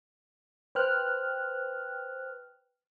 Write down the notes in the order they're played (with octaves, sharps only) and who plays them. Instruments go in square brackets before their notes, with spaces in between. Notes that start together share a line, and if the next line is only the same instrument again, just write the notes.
[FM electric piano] B4 C5 G5 F6 F#6